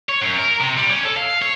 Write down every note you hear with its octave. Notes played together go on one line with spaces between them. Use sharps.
C#5
F#2
A#4
C3
G3
C#4
A4
F5
C#5